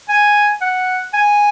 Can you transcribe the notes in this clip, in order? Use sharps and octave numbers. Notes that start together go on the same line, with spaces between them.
G#5
F#5
G#5